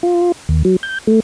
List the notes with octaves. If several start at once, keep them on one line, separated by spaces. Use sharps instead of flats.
F4
D#2
F#3
G6
A3